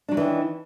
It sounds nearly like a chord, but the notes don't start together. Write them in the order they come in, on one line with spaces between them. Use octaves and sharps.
D4 F#3 C#4 E3 D#3